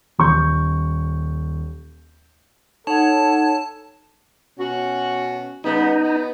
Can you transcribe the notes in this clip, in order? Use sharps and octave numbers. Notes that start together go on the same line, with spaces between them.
D#1 C#6 G6
D#4 A4 C#5 F#5 A5
B2 C#4 F#4
C#3 G3 B3 D#4
B3